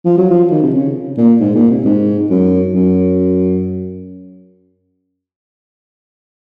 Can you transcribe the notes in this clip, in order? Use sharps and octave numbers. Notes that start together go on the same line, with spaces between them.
F3
F#3
F3
D#3
C3
C#3
A#2
G#2
A#2
C3
G#2
F#2
F#2